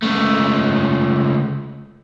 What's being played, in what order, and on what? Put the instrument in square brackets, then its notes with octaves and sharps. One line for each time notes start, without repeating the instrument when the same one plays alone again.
[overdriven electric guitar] C#2 A3